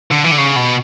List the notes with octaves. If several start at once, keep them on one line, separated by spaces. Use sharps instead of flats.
D3
E3
D3
C#3
B2